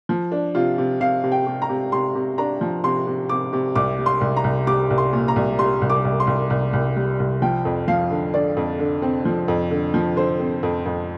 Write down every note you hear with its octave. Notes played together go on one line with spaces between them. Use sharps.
F3
D4
C3 F4
C3
C3 F5
C3
G5
C3
A#5
C3
C3 C6
C3
D4 A#5
F3
C3 C6
C3
C3 D6
C3
C2 D6
G3
C6
C2
A#5
C2
G3 D6
C2
C6
A#2
A#5
C2
G3 C6
C2
D6
C2
C6
C2
C2
C2
G3
C2
F3 G5
F2
F3 F5
D3
D3 D5
F2
D3
C4
F3
F2
D3
F3
D3 C5
C4
F2
F2